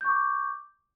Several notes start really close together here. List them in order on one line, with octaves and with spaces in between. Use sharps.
G6 C#6 D6